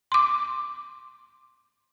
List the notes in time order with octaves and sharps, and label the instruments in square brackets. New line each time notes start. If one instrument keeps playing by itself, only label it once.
[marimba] C6 D6